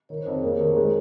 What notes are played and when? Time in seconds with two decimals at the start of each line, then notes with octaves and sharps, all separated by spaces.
0.09 D#3 C#5
0.17 C5
0.26 F2 A#4
0.34 G#4
0.43 A#3 G4
0.60 D#3
0.76 G#3